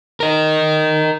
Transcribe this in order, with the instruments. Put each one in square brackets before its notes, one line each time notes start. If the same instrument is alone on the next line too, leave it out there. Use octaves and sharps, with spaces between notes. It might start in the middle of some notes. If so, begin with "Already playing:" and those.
[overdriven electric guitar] A#4 D#5